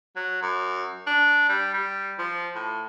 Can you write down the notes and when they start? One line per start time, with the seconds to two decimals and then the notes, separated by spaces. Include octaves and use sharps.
0.16 F#3
0.42 F#2
1.07 D4
1.49 G3
1.74 G3
2.18 F3
2.55 A2